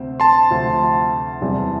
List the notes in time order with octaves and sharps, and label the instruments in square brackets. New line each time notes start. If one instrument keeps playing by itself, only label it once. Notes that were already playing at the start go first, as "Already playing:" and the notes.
Already playing: [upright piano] D2 C3 C4
[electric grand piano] A5 C6
[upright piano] D2 C3 F3 C4
E2 C3 G3 B3 E4